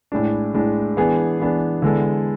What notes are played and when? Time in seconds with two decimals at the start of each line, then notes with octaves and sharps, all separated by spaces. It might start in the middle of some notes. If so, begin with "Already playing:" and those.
0.12 A2 G#3 D4
0.54 A2 G#3 D4
0.97 E3 B3 D4 G#4
1.40 E3 B3 D4 G#4
1.82 D3 G#3 B3 E4 A4